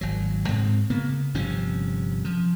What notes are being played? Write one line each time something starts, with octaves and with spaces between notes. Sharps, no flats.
G#1 F#3
G#2 G#3 C4
C#3 A#3 B3
G1 C3 F3 C#4
F3